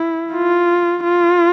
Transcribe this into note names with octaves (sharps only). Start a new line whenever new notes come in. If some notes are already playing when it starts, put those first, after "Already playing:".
Already playing: E4
F4
F4